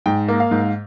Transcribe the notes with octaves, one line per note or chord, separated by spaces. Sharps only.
G#2 G5
A#3
F5
G#2